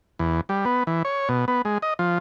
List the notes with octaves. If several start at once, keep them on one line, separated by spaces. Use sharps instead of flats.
E2
G3
B3
E3
C#5
B2
B3
G#3
D#5
F3